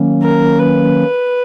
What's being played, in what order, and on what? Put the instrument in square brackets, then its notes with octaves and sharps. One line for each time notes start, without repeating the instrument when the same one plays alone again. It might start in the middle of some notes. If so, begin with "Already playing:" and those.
Already playing: [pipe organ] D#3 F#3 A#3 C#4
[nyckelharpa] A#4
B4